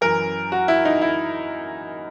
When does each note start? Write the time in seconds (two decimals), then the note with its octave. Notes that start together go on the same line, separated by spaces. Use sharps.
0.01 F#2 E3 A#4
0.52 F#4
0.68 E4
0.85 D#4
1.02 E4